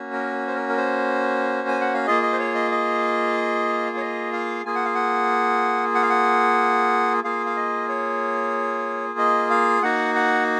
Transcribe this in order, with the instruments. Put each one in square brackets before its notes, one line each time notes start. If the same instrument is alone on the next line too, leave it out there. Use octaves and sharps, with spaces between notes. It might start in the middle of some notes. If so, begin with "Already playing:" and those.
Already playing: [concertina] A#3 C#4 F#4
A#4
C5
A#4
A#4
C5
G#5
F#5
F5
A#3 F4 G#4 D#5
D#5
C5
C#5
D#5
D#5
C#5
D#5
F5
A#3 F4 G#4 G#5
F#5
F5
F#5
F#5
F5
F#5
A#3 F4 G#4 F5
F5
D#5
C#5
D#5
F5
A#3 D#4 F#4 F#5
F#5